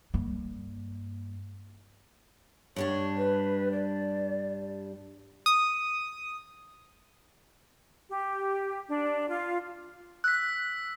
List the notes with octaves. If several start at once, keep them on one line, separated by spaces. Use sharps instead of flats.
G2 A#3
G2 G3 D4 C#5
B4
D5
D#6
G4
D4
F4
E6 F#6 B6